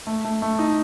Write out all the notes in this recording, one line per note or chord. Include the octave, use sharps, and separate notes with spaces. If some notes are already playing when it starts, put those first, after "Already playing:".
A3
A3
A3
D#4